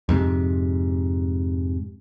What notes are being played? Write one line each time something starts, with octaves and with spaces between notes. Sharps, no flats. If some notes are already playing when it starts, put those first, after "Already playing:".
F2 G#2 C3